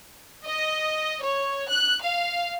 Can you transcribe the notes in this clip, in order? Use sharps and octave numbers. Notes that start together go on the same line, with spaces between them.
D#5
C#5
F#6
F5